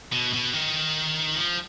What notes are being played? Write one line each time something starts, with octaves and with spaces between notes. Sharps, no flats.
B2
B2
D#3
F3